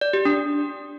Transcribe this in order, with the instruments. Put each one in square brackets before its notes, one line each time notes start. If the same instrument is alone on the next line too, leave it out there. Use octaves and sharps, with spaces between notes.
[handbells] D5
G4
D4